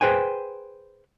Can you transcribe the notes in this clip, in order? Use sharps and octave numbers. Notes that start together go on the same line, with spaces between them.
G#4 B4 C5 G5 G#5